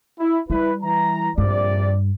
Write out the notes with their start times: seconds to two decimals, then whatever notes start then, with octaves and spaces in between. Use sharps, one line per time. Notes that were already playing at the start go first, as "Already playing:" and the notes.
0.20 E4
0.50 G3 E4 B4
0.83 E3 A#5
1.38 A#1 G2 C3 D5